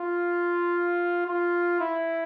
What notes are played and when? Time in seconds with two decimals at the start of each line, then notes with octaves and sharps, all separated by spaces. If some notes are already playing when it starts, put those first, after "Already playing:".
Already playing: F4
1.26 F4
1.80 E4